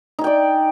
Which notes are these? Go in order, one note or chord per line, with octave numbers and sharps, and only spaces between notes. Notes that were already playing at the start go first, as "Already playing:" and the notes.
D#4 D5 G5 G#5